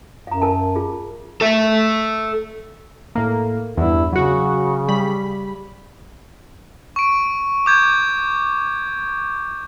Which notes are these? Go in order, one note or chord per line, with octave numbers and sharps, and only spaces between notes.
F#2 F5 A#5
A#4 G#5 A5
F4 G#4
A4 E5
A2 A#3
E2 G2 E4
C#3 F#3 F#4
G3 B5
C#6 D7
D6 G6 G#6